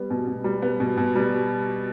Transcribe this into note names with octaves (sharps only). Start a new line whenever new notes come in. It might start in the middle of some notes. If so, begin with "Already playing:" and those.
Already playing: G3 B3
B2
B2
G3
B3
B2
B2
G3